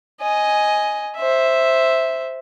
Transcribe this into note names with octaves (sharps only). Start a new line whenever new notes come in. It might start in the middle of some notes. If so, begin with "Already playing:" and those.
D#5 G#5
C5 E5